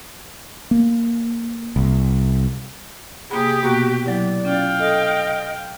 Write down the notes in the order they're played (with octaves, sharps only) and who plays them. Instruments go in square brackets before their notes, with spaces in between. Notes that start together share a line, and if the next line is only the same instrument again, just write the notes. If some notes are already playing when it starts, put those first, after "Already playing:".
[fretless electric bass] A#3
[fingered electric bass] C2
[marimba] C3 A#3 B5 [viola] G4 [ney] G#4
[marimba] B2 A#3 B3 [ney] F#4
[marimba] F#3 E4 [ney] D5
[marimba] C#4 F4 [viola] F5 G5
[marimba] A4 [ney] D#5